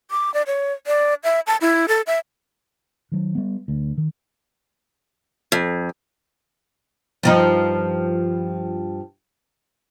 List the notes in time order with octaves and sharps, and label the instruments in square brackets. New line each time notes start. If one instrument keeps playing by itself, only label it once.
[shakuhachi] D6
D5
C#5
D5
E5
A5
E4
A4
E5
[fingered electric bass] D#3 F#3
G3 B3
D2
D#3
[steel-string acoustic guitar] F2
[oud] G2 F3 D#4